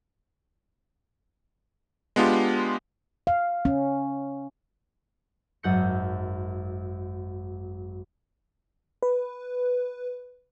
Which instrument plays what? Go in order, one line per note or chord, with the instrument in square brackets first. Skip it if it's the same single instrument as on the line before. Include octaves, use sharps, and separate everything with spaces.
[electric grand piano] G#3 B3 D4 F4 G4
[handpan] F5
C#4
[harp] G#1 F#2 F#5 G6 C#7
[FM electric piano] B4